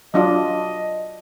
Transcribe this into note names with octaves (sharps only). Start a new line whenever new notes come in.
F#3 D4 F4 D#5